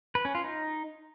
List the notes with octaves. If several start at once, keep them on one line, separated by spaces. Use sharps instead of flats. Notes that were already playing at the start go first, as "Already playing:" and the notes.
B4
C#4
F4
D#4